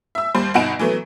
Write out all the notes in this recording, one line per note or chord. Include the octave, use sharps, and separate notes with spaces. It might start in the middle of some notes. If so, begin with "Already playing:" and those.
E5 E6
D#2 G3 C5
G1 B2 D#4 F#5 D7 E7
E3 F#3 A3 B3